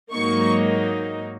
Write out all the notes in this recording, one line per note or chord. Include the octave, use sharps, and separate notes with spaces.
G#2 F#3 A#3 D#4 C#6